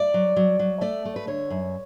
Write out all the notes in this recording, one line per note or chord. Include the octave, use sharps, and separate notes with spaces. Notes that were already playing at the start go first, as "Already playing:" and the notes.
Already playing: D5
F#3
F#3
F#3
A3 D5
A3
B4
D3 C#5
F#2